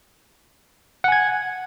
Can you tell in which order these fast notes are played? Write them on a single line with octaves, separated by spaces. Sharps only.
F#5 G#5 G#6